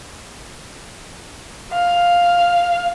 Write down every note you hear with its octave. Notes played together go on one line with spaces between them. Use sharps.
F5